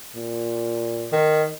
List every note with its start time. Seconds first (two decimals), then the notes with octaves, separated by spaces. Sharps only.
0.16 A#2
1.12 D#3